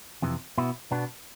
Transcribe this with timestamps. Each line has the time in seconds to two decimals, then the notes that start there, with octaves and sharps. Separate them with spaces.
0.22 F2 C3 E3
0.58 B2 B3 E4
0.92 B2 B3 D4